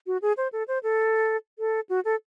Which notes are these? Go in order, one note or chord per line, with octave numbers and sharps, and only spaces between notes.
F#4
G#4
C5
A4
C5
A4
A4
F#4
A4